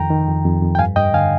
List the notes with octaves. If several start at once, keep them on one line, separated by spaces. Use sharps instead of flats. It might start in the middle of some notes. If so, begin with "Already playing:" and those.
Already playing: F2 D#3 G5 A#5
D#3
F2
F2
F2
G5
G2 F5 G#5
G2 D#5 G5
D3 F5 G#5